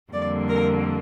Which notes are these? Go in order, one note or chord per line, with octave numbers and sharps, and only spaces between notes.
F2 D3 G3 A#3 D5
A#4